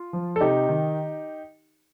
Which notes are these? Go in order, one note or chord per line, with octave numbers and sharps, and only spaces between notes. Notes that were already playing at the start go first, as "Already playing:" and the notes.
Already playing: F4
F3
A4
C3 D#4 G4
D#3